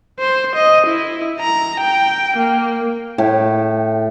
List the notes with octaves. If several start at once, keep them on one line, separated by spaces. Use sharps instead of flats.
C5
D#5
E4
A#5
G5
A#3
A2 A4 G5 B5